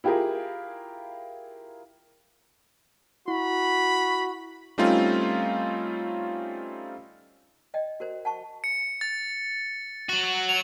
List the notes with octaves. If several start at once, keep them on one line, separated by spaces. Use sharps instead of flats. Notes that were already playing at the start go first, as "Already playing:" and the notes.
E4 F4 G4 G#4 A#4
E4 F#4 B5
G3 A3 C4 C#4 D#4 F4
D5 D#5 G5
F#4 A#4 C5
F#5 A5 C#6
C#7
A6
F#3 F#4 F#7
F7